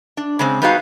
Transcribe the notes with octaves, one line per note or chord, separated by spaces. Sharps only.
D4
C#3 G#3 C4
G3 G#3 B3 D#4 F#4 F5